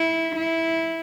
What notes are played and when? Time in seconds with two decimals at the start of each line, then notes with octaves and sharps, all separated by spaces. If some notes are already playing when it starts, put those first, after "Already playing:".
Already playing: E4
0.36 E4